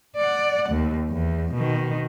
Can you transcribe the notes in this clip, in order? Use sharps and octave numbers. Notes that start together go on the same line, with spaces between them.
D5 F#5
D#2
E2
B2 D#3